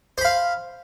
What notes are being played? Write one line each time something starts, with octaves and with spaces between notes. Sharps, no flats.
C5 F5 B5